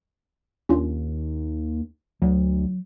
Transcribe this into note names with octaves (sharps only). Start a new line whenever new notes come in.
D#2 C#4 D4 F4
D2 F#3